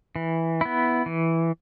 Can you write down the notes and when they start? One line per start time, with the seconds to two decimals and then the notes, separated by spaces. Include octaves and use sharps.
0.16 E3
0.61 B3 E4
1.06 E3